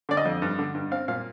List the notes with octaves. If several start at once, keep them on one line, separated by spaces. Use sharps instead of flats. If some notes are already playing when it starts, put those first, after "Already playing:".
D3 D5
D#5
F2
G2
D3
G2
C4 F5
A#2 F5